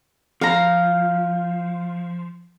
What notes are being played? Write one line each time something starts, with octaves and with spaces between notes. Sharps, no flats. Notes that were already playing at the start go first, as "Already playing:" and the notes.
F3 F5 A#5